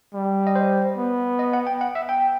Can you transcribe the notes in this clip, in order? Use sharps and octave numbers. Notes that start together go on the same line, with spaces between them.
G3
D#5
C5
B3
D#5
F#5
G5
F#5
E5
G5